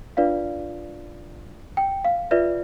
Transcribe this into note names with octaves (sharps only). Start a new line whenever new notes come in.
D4 F4 B4 D5 F5
G5
F5
F4 B4 D5 E5